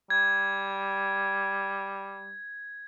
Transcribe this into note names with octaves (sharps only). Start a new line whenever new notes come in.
G3 G#6